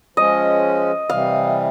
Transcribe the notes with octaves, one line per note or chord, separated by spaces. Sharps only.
F3 G#3 C#4 D#5
C3 E3 G3 F5